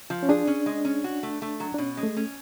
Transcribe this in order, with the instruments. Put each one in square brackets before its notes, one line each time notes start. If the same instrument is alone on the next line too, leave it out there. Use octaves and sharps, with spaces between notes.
[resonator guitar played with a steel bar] F3
[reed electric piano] C#4
[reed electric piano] D4 [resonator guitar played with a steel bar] G#4
[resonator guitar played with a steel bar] C#4
G#3
C#4
F#4
A3
A3
F#3
[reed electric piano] D4
[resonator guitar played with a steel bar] B2 [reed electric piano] C#4
[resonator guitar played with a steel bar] G#3
[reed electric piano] A3
[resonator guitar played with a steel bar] C#4